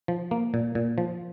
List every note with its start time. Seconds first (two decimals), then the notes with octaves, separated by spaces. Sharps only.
0.08 F3
0.31 A#3
0.54 A#2
0.75 A#2
0.98 F3